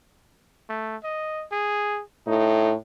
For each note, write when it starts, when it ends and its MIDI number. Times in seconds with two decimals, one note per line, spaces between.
0.69 0.97 57
1.04 1.45 75
1.52 2.02 68
2.27 2.73 45
2.27 2.74 63